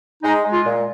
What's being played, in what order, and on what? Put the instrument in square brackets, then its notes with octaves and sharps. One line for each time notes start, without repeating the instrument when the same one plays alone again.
[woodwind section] G#3 D#4
G#3
F4
A#2